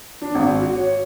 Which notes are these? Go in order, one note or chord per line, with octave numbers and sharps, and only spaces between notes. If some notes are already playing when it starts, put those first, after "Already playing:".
D4
G#1
F#4
C#5